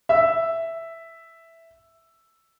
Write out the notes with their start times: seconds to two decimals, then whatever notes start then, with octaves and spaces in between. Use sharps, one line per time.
0.09 E5 E6